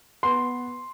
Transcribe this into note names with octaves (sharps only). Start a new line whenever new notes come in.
B3 C6